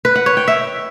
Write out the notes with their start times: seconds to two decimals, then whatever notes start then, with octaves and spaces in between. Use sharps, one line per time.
0.05 B4
0.15 F#5
0.26 C#5
0.37 G5
0.48 E5